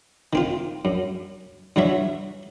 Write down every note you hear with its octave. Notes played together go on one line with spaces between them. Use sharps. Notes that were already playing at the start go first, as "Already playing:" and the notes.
D#3 C4 F4
F#2
G2 E3 F#3 C#5 E5